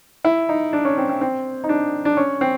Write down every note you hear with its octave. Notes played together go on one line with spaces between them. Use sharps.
E4
D#4
D4
C#4
C4
C4
C4
D#4
D4
D4
C#4
C4